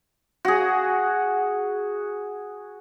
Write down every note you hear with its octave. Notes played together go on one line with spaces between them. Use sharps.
F#4 G#4